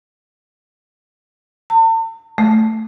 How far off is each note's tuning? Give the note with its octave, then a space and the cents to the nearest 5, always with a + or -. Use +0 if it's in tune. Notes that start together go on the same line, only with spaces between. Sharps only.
A5 +45
A3 +0